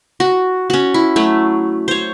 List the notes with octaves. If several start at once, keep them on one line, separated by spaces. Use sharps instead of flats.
F#4
C#4 F#4
E4
F#3 A3
C5 C#5